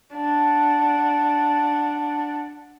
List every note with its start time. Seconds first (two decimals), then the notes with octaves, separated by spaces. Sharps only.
0.14 D4 F#5